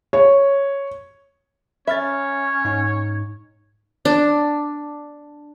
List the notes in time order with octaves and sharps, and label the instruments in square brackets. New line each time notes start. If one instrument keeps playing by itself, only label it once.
[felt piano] C#5
[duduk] C#4 [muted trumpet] C#5 [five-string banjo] E5 [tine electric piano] B5 F6 A6
[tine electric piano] G#2 D#4
[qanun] D4